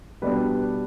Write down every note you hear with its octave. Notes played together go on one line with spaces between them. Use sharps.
B2 G3 B3 D4 B4